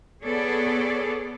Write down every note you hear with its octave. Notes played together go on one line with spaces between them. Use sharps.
B3 G#4 A4 C#5 D5